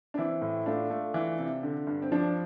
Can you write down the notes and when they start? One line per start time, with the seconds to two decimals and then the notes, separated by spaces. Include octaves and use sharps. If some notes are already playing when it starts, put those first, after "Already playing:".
0.14 D4
0.18 E3 C4 E4
0.42 A2
0.66 A3 D4 F4
0.90 A3
1.14 E3
1.39 C3
1.63 D3
1.87 G2
2.02 C4
2.12 F3 D4